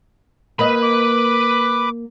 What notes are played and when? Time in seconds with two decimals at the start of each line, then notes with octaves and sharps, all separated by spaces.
0.59 A#3 B4 D#5 B5
0.82 D6